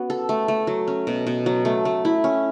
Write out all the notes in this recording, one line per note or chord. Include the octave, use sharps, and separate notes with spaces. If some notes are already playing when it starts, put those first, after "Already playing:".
Already playing: B3 C#4 F#4
A4
A3
A3
F#3
C#4
B2
B2
F#3
A3
A3
E4
C#4